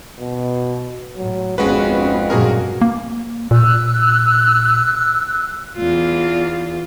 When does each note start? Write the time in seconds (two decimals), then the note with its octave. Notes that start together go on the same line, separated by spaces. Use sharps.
0.19 B2
1.17 A2 F#3
1.58 G#1 F2 G#3 B3 C#4 F#4 B4
2.30 G2 A#2 F#3 F#4 G#4 A#4
2.81 A#3
3.51 A#2 E6 F#6
5.77 E2 F4